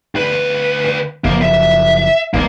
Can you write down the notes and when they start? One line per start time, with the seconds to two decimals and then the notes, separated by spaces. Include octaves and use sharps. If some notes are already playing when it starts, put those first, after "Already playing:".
0.15 D2 B4
1.24 F#1 F3 A#3
1.42 E5
2.34 D#1 B1 C3 A#3